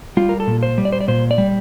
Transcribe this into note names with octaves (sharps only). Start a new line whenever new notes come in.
G3 F4
A#4
A4
A#2
C5
G3
D5
C5
D5
A#2 C5
D5
G3